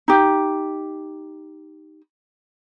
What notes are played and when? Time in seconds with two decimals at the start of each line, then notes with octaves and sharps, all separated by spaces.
0.08 D#4 G4